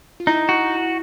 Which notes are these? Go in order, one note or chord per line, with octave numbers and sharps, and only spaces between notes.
F4
D#4 E4
F#4